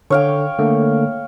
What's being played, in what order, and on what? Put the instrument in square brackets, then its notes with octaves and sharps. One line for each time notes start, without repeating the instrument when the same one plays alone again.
[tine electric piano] D3 [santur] C#5 F5 G5
[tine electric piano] D3 A3 A#3